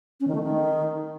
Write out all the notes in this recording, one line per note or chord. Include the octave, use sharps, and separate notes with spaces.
C#4
D#3
A3
D#3